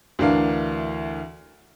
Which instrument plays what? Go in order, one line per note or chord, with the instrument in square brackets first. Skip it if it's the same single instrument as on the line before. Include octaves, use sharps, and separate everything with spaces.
[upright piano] D2 E3 D4 A#4 F5